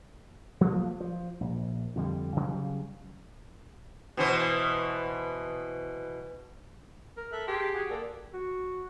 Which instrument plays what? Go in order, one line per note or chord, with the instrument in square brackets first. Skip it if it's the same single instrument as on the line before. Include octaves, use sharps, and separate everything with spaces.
[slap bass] F3 F#3 A3 A#3
F3
A#1
F2 D3 G3
C#3 F#3 G3
[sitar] B2 E3 C5
[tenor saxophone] A#4
[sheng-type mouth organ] A4 E5 F#6
[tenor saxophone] G4 [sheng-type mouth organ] G#4 A5 C6
[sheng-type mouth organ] F#4 G#4
[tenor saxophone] A#3 [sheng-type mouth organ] A4 D5
[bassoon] F#4